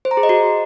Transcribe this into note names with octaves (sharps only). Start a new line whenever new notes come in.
C5
A#5
G#4
D#5
F#4